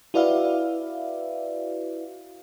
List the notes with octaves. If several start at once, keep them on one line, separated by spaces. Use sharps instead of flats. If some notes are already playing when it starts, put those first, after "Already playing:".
E4 F#4 B4 D5 E5 F5